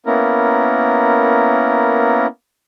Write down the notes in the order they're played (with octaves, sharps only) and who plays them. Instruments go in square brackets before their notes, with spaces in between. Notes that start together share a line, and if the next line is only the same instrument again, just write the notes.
[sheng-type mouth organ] A#3 B3 C#4 E4 A#4